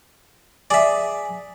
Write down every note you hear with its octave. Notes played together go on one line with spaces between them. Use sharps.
G#4 D5 E5